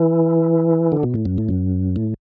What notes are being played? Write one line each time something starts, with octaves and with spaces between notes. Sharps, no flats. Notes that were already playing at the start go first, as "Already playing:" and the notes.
Already playing: E3
D3
B2
A2
F#2
A2
F#2
A2